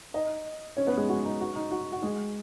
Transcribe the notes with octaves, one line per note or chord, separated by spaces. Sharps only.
D#4 D#5
C#4 C#5
B3 B4
G#3 G#4
F#4
D#4
F#4
D#4
F#4
F#4
G#3 G#4